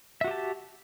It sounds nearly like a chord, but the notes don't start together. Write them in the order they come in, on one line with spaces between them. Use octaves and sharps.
E5 F#4 G4 A5